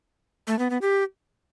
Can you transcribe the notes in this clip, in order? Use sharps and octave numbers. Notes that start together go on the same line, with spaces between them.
A3
B3
B3
G4